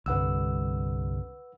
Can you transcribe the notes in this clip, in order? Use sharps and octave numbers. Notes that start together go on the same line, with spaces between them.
C2 G2 D3 B4 F#5 E6